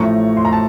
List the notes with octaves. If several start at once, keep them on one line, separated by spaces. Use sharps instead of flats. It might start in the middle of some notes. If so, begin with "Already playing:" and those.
Already playing: A1 A2 F3 A3 A#5 C#6
C6
A#5
A5